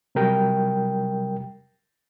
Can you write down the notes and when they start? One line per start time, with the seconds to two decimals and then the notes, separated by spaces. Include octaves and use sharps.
0.15 C3 F#3 G3 A#4 G5